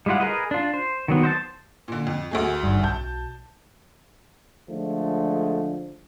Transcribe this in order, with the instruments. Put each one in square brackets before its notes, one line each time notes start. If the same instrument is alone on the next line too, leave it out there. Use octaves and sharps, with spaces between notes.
[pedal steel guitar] G3 G#3 E4 F4 F#5
G#4 A#4 B4 D#5
D4 F4
C5
D#3 F#3 B3
C5 D#5 A5
[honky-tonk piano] A#2 D3
F2
D2 A3 G#4
[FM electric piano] G#1 G2
[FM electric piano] B1 [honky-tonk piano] A5 G6
[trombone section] D3 F3 G#3 A3